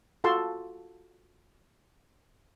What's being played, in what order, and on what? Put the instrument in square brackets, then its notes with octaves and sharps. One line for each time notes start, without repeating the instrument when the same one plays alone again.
[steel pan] F4 F#4 A4 A5 C6